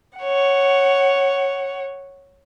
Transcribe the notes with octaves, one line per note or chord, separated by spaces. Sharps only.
C#5 F#5